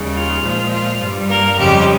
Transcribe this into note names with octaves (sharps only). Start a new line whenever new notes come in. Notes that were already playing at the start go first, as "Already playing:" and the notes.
Already playing: D#2 C#3 G3
F4
A#2 F3 G#3
F4
G2 G3
A#3 A#4
F2 C#3 F3 G3 G#3 G4